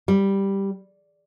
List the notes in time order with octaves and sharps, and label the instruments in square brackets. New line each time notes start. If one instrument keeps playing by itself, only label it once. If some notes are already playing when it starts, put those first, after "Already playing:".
[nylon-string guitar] G3